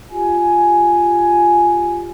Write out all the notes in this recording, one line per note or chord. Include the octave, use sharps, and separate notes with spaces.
F4 G4 G#5